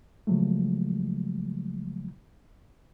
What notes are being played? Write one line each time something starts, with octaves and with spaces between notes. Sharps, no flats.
C#3 F3 F#3 G#3 A3